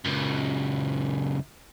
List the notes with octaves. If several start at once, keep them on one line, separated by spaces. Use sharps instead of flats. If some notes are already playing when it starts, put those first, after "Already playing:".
C#2 F#2